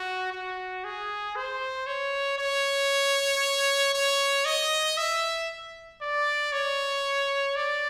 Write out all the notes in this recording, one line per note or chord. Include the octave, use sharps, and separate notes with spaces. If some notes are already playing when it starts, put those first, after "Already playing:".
Already playing: F#4
F#4
G#4
C5
C#5
C#5
C#5
D#5
E5
D5
C#5
D5